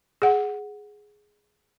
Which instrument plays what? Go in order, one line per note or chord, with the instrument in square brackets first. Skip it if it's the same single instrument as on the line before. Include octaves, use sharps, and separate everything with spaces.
[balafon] G#4 F#5